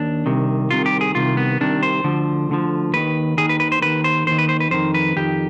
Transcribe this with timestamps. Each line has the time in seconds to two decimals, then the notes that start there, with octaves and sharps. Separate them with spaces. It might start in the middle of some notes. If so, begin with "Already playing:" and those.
Already playing: D#2 D4
0.26 C2 C3 D#3
0.71 C2 C3 D#3 F4
0.86 G4
1.01 G#4
1.15 C2 C3 D#3 F4
1.37 B3
1.60 C2 C3 D#3 D4
1.83 C5
2.04 D2 D3 F3
2.50 D2 D3 F3
2.94 D#2 D#3 B4
3.37 D#2 D#3 G#4
3.49 B4
3.60 B4
3.72 C5
3.82 D#2 D#3 B4
4.04 C5
4.27 D#2 D#3 C5
4.38 B4
4.49 C5
4.60 B4
4.71 F2 D#3 C5
4.94 B4
5.16 F2 D#3 G4